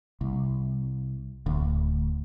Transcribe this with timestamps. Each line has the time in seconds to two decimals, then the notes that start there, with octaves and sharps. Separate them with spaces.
0.21 C2
1.46 D1 D2